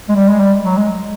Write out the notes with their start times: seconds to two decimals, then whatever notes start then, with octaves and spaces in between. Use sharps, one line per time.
0.09 G#3
0.16 G3
0.29 G#3
0.40 G3
0.64 F#3
0.77 G#3